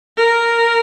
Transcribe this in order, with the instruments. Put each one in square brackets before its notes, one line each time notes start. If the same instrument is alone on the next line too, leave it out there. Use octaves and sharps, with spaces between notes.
[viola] A#4